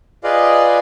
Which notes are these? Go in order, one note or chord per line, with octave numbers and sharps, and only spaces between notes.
F4 G#4 B4 D5 D#5 F5